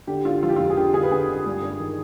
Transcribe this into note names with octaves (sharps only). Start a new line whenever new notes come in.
D3 G4
D3 F4
F3 F4
G4
F2 F4
G#4
D3 G4
D3 G#4
B4
D3 G#4
D3
G2
G2
D#3